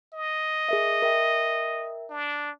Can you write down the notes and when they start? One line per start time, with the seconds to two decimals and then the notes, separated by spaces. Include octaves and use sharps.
0.14 D#5
0.69 G#4 A#4 E5
1.02 A#4 E5 G5
2.10 D4